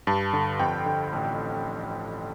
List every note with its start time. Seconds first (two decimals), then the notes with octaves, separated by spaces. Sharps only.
0.07 G2 A5
0.33 D3
0.60 F2 G5
0.86 D3
1.13 A1